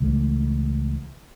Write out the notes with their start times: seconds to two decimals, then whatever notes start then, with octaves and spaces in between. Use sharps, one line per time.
0.01 C#2 E3 A3